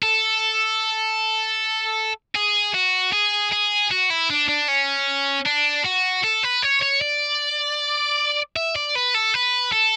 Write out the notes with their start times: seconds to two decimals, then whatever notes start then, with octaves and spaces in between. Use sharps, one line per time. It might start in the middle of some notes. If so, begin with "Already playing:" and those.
0.03 A4
2.35 G#4
2.74 F#4
3.13 G#4
3.52 G#4
3.91 F#4
4.10 E4
4.30 D4
4.49 D4
4.68 C#4
5.46 D4
5.85 F#4
6.24 A4
6.43 B4
6.62 C#5
6.82 C#5
7.01 D5
8.56 E5
8.76 D5
8.95 B4
9.14 A4
9.34 B4
9.73 A4